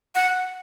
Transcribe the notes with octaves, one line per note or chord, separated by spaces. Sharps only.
F#5